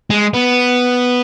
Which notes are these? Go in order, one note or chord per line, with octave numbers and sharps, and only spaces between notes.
G#3
B3